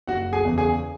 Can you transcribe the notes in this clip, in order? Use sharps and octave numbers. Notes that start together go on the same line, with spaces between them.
F#1 F#4 F#5
G#4 G#5
E2 C#3
G#4 G#5